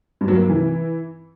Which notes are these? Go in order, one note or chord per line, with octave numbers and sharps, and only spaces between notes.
G2
F#3
A#3
C3
E3